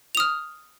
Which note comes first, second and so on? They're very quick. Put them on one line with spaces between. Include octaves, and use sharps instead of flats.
F7 D#6 F6